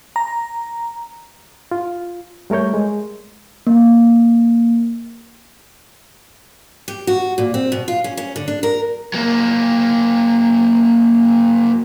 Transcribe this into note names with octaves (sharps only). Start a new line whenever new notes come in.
A#5
F4
G3 A3 A#4 C#5 G6
G#3
A#3
G4
F#4
A#2
C4
B2
F4
C#4
C#4
D3
D4
A#4
F#3 A#3